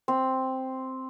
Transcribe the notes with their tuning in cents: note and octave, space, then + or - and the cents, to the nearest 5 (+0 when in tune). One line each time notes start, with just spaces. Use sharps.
C4 +0